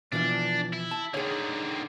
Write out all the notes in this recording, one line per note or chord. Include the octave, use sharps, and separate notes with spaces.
B2 E3 F3 D4
E4
A5
D3 D#3 G#4 C#5